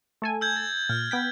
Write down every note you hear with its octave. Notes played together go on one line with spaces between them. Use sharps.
A3 A4 G#5
E6 G6 G#6
A6
A#2 F6
B3 G5 B6